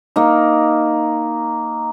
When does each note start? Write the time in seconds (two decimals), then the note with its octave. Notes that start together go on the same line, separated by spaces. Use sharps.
0.16 A#3 D#4